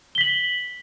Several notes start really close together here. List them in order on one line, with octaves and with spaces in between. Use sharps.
G7 B6 F#7